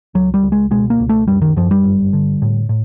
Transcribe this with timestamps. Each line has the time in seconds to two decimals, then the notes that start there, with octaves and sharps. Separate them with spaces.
0.15 C#2 F#3
0.34 G3
0.43 C#2
0.52 G#3
0.71 B2 G#3
0.90 A#3
1.00 C#2
1.09 A3
1.28 F#2 G3
1.42 D#3
1.56 F#2 F3
1.71 G3
1.84 G1
2.13 D3
2.42 A2
2.69 A2